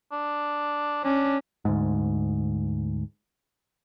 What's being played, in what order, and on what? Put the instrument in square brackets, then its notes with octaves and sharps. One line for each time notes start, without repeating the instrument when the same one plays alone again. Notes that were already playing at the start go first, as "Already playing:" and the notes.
[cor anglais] D4
[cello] C#4 [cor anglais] D4
[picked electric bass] D2 G#2